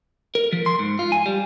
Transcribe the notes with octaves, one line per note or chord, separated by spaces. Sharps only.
A#4
F3
C6
G#2
F4
G#5
G3